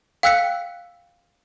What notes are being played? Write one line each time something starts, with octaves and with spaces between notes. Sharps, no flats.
F5 G5 E6 F#6 B6 C#7